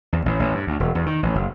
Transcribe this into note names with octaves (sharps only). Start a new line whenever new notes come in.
E2
A1
A1
G2
D2
E1
E2
D#3
A1
F#1